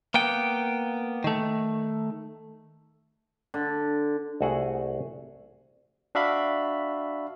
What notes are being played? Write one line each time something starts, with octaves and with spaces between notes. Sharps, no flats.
A#3 B3 G5
D#3 A3
D3
C2 A3 F#4 G#4 F#5
D4 F#4 E5 F5 B5